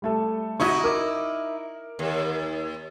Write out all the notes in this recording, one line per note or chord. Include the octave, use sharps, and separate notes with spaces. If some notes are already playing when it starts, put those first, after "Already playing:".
G3 A3 A4
D#4 E4 F#4 D#5 C#6
A#4 D6
D#2